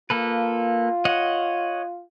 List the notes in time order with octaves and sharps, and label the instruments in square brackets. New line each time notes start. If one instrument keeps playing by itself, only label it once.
[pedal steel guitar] A#3 A4 B4 [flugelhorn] F4
[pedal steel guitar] C#5 D#5 F#5